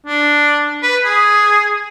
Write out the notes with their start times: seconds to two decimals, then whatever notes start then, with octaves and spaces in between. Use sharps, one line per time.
0.06 D4
0.83 B4
1.04 G#4